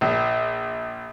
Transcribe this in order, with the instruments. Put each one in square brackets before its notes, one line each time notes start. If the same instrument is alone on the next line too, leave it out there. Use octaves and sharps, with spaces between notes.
[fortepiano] A#1